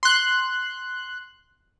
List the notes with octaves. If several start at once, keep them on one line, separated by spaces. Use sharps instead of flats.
C6 F#6